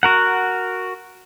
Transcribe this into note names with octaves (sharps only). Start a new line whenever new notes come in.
F#4 A#4 F#5